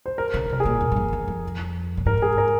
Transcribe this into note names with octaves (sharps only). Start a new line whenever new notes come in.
C5
A#4
C#3
C3 A#4
G#4
A#2
E2
G2
F2
E2
F2
A#2
G#2 A#4
G#4
A#4